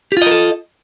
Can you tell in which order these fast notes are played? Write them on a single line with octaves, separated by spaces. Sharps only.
G4 F4 D#5 A#4 A4